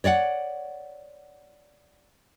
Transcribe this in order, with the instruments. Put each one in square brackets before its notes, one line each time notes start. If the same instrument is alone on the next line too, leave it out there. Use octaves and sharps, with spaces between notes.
[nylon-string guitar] C#5 D5 F5 F#5